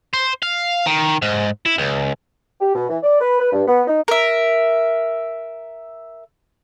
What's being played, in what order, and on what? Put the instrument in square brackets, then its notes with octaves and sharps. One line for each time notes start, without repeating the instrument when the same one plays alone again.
[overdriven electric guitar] C5
F5
D#3
G#2
E4
C#2
[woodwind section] G4
B2
E3
D5
B4
B4
G2
B3
D#4
[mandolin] A#4 E5